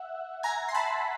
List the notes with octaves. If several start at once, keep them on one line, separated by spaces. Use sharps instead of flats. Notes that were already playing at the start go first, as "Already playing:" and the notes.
Already playing: E5 F#5
G#5 A#5
C6
A5 B5